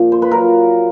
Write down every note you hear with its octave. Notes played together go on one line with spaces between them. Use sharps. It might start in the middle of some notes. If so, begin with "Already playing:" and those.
Already playing: A#2 F3
C5
B4
A#2 F#3 A#4